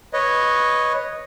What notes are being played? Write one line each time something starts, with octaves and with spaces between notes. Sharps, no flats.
B4 C#5 D#5